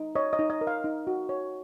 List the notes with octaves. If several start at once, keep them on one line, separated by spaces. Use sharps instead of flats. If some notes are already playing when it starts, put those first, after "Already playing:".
Already playing: D#4
C#5 D#5
D#5
D#4
D#5
A#4
F5
D#4
F#4
C#5